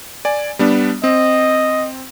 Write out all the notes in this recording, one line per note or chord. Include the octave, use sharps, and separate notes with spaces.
D5 G#5
G3 B3 D4
C4 D#5